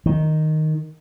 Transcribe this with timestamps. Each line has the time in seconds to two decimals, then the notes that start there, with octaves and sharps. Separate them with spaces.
0.06 D#3